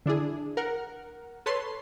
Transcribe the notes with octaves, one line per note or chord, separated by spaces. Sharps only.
D3 D4 E4 G#4
A#4 F#5
A4 B4 C#5 A5 C6